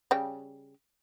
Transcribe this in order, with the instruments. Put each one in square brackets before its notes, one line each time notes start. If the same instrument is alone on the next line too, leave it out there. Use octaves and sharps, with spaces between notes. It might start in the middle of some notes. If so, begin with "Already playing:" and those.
[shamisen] C#3 G3 G5